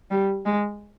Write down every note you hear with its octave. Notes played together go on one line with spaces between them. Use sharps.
G3
G#3